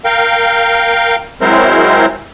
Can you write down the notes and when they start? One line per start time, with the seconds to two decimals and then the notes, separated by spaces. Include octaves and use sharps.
0.05 A#4 F5 G5
1.41 F#3 G#3 C4 E4 A#4 C5